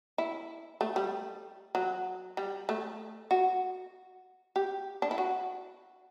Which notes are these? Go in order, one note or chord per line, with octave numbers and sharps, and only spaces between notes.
E4
A3
G3
F#3
G3
A3
F#4
G4
D4
E4
F#4